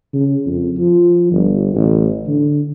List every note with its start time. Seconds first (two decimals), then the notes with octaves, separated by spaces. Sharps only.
0.14 C#3
0.46 F2
0.77 F3
1.32 G1
1.74 A1
2.27 D3